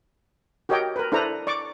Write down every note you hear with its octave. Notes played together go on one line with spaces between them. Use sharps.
F#4 G4 A#4 C#5 D#5 G5
A#4 B4
D4 E4 A4 B4 C5 A#5
D5 C#6 D6